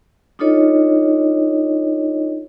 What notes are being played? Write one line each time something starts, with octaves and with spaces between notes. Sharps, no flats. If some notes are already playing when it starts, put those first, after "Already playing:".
D4 D#4 F4 A4 C#5 D#5